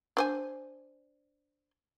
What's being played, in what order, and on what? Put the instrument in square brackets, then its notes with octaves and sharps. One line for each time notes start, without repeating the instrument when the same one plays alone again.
[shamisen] D4 C5 G#5